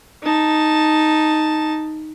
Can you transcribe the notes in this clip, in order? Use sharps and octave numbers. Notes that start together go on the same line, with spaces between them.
D#4 A5